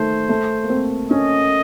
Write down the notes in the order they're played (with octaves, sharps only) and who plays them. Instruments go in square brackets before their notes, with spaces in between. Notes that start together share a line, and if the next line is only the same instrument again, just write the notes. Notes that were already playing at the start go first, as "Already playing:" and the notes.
Already playing: [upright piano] D#3 A3 [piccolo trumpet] C5
[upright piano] A3
A#3
C4
[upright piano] C#4 [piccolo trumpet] D#5